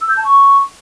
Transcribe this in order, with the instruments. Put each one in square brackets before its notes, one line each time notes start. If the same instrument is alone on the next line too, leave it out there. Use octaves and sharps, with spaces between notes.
[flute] E6
G6
A5
C#6